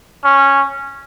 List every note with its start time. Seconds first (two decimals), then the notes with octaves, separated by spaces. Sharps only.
0.24 C#4